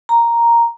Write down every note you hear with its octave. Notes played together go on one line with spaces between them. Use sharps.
A#5